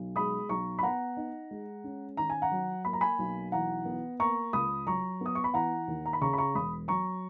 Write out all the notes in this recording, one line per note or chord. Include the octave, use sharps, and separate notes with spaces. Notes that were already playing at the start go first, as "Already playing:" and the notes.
Already playing: B1
G#3 B5 D#6
B1 A#5 C#6
B5
B3 F#5 A#5
D#4
G#3
C#4
D#3 A#5
G#5
F#5 A#5
F#3
A#3 B5
A#5
G#5 B5
B1
E3 F#5 A#5
B3
A#3 A#5 C#6
C#2 B5 D#6
F#3 A#5 C#6
B3 D#6
C#6
B5
E3 F#5 A#5
D#2
A#5
B5
C#3 A#5 C#6
B5
A#5 C#6
E1 B5 D#6
F#3 A#5 C#6